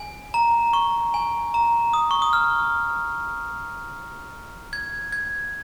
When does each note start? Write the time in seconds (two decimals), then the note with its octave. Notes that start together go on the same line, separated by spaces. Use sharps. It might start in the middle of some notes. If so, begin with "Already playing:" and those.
Already playing: G#5
0.34 A#5
0.73 C#6
1.14 G#5
1.54 A#5
1.93 D#6
2.11 C#6
2.22 D#6
2.33 F6
4.73 G#6
5.12 G#6